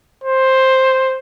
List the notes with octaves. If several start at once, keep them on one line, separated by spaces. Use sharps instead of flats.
C5